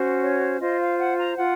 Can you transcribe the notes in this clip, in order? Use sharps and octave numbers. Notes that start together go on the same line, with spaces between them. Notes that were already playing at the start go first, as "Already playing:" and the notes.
Already playing: C#4 F#4 C5
C#5
F4 C5 D#5
F5
F#5
A#5
F4 F#5